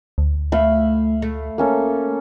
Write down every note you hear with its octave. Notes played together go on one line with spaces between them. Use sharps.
D2
A3 E5 F5 B5
A3
A#3 C#4 A4